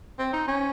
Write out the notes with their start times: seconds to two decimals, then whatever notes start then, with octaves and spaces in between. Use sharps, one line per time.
0.19 C4
0.33 D#4
0.48 C#4